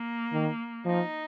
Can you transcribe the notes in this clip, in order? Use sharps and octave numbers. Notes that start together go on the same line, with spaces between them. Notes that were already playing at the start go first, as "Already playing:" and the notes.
Already playing: A#3
D#3
F3 D#4